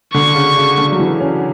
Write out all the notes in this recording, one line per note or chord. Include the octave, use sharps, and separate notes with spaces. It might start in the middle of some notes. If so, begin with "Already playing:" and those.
D3 C#6
C#3
C#3
D3
F#3
E3
C#4